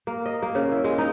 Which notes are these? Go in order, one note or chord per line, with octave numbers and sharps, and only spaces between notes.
A#3
D#5
A#3
C#3
E4
G#3
D#4